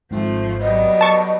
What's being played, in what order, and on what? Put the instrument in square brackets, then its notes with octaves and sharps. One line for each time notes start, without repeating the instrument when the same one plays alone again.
[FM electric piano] G#1 G#2 C4 [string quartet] F3 A3
[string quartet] F#3 G3 B3 [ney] D#5
[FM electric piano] A4 A#4 D5 [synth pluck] A5 C#6